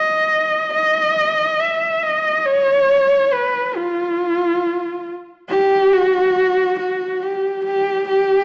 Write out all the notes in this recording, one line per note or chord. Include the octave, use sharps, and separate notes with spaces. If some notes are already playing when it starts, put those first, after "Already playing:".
Already playing: D#5
D#5
E5
D#5
C#5
B4
F4
G4
F#4
F#4
G4
G4
G4